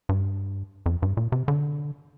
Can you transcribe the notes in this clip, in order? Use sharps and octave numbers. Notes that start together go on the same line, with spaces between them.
G2
F2
G2
A#2
C3
D3